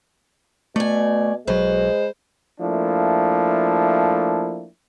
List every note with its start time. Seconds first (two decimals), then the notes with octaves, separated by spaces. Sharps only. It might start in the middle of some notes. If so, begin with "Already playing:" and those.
0.76 B2 A3 D5 G#5
1.47 B1 F#3 G#3 B4 C5
2.61 F3 A3 A#3 D4 E4